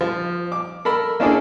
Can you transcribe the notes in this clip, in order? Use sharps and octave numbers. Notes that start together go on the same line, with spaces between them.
F3
D6
A4 A#4 B5
A#3 C#4 D4 E4 G#4 A4